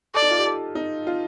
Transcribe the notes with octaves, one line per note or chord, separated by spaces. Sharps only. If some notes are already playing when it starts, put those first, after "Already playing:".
A4 D5
D#4
F4
G4
A4
D#4
F4